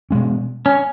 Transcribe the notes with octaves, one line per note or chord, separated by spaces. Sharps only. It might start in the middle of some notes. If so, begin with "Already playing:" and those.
B2 G#3 C#4
C#4